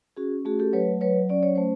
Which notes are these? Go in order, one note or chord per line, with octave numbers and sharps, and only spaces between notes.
C#4 F#4 G#4
A3 F#4 G#4
G4 A4
F#3 B4 C#5
F#3 B4 C#5
C#4 D5
C#5
A3 C5